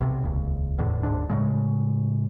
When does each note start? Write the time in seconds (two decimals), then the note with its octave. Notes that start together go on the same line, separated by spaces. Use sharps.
0.01 B1 C3
0.23 D#1 C#2
0.78 F1 E2 A2 D3
1.03 F#1 D2 G#2 D4
1.30 A2 C#3 G#3